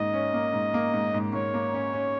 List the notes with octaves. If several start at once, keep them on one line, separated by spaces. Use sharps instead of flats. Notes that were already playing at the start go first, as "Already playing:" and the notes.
Already playing: G#2 D#3 A#3 C#4 D#5
C#4
A#3
G#2
A#3
G#2
G#2
G#2 C#5
A#3
C#4
C#4